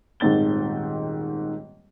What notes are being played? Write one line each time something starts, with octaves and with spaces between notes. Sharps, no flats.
D#1 G#2 D#3 C4 A6 G7